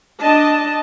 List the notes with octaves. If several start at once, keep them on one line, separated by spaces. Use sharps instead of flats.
D4 D#5 A5